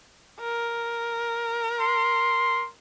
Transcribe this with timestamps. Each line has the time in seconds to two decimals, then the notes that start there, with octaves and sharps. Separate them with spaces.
0.40 A#4
1.80 C6